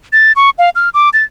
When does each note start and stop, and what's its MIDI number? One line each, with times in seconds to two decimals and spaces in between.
0.13 0.32 93
0.36 0.50 85
0.58 0.70 77
0.75 0.89 89
0.94 1.10 86
1.13 1.24 93